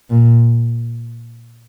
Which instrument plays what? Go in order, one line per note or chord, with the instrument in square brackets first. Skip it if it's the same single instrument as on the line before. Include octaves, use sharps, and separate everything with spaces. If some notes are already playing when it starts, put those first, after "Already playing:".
[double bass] A#2